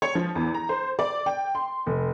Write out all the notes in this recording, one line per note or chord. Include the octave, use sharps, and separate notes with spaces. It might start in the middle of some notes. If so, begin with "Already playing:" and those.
C#5
F3
E2
A#5
C5
D5
G5
C6
F1